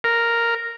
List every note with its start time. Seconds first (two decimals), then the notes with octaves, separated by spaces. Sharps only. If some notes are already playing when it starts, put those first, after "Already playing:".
0.04 A#4